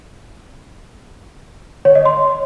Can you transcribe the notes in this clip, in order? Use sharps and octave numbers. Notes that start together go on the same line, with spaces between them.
C#5
D#5
C6